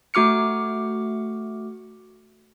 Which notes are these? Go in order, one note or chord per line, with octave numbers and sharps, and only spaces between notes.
A3 F#4 D6 F6 C#7